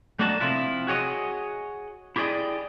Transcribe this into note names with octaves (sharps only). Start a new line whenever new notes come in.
A3 A#3 D4 F#4 D#5 A5
C3 F3 E4 F4
F#4 G#4 C#5 D#5
E4 G4 G#4 C5 D5 D#5